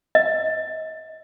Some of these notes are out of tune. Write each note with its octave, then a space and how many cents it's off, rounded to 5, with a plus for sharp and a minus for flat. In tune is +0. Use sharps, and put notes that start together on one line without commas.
D#5 +35